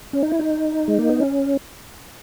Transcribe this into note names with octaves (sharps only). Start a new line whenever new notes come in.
C#4
D#4
E4
D#4
G#3
A#3
B3
C#4